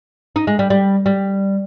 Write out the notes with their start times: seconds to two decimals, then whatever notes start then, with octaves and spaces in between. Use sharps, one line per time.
0.36 D#4
0.47 G#3
0.59 G3
0.70 G3
1.06 G3